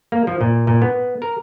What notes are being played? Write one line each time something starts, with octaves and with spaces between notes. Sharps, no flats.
A#3
F3
A#2
A#2
B3
A#4